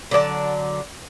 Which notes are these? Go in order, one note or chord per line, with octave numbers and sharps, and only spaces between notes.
D3 F#3 D5 A5